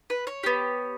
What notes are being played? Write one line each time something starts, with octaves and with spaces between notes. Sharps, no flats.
B4
C#5
B3 G4